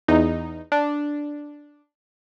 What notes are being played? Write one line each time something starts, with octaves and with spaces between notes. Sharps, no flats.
E2 D#4
D4